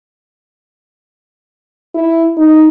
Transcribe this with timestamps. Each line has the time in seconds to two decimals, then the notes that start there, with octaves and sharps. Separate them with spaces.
1.95 E4
2.37 D#4